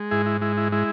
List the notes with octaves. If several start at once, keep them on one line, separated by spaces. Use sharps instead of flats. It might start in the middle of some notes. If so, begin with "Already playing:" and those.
Already playing: G#3
G#2 E4 G#4
E4
G#3 E4
E4
G#3 E4